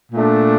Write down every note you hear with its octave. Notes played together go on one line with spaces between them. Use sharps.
A#2 A3 D4